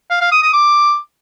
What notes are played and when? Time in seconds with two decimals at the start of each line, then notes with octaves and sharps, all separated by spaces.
0.10 F5
0.21 F5
0.32 D#6
0.42 D#6
0.53 D6